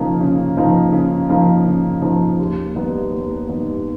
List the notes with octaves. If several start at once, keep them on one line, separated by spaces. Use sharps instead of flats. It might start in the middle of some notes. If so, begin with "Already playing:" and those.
Already playing: C#3 F3 A#3 D#4
C#3
F3 A#3 D#4
C#3
F3 A#3 D#4
C#3
F3 A#3 D#4
D#2
D#3 G3 B3 D#4
D#2
D#3 G3 B3 D#4